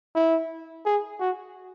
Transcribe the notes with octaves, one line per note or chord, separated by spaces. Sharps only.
E4
G#4
F#4